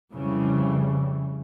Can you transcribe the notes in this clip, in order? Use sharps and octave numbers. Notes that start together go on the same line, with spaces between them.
F2 C#3 E3 G3